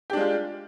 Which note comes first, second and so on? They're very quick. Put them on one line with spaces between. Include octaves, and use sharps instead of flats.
G4 D4 G#3 F4